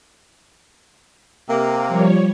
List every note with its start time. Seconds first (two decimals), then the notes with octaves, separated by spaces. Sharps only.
1.48 C3 A#3
1.88 F3 G3 C#5